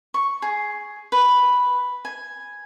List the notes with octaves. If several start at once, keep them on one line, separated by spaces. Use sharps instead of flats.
C#6
G#4
B4
G#5